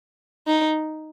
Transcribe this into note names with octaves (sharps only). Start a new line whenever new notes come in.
D#4